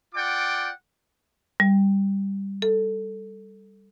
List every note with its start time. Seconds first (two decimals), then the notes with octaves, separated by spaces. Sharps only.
0.14 F4 D5 F#5 G5 D6
1.60 G3
2.62 A4